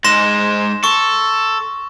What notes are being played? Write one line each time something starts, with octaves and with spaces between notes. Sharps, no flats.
G#2 G#3 C6 A#6 E7
A4 C#6